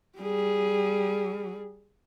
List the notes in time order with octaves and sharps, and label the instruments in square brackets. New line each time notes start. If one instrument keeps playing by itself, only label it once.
[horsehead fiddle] G3 G#4